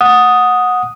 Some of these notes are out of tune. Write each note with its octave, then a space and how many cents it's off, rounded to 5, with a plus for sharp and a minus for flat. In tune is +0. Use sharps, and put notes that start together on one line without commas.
F#5 -15 D#6 +0